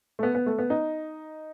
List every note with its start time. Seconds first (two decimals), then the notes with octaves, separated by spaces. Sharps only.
0.19 A3
0.23 B3
0.35 B3
0.46 A3
0.59 B3
0.70 D#4